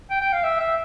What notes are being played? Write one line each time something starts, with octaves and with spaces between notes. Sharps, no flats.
G5
G5
F5
E5
E5